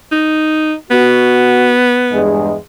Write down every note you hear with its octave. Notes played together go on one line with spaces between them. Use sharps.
D#4
B3 F#4
E2 G2 G#3